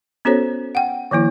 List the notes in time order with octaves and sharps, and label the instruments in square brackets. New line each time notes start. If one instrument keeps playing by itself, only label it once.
[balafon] B3 C#4 F#4 A4 C5 C#5
F#5 G5
D#3 F3 A#3 E4